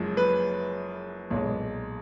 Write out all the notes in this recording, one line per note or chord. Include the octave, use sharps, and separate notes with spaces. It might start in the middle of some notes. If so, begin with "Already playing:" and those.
Already playing: F#1 F#2 F3 G#3
B4
B1 A#2 G#3